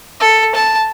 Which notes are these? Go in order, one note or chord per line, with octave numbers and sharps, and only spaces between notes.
A4
A5